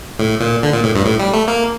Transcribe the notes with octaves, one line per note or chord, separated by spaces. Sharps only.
A2
A#2
D3
A#2
A2
G2
A2
G3
A3
A#3